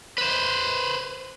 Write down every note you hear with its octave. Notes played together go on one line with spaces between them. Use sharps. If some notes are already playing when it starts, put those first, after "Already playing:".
B4 C5